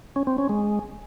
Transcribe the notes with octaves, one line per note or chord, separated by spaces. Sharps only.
C#4
C4
C#4
G#3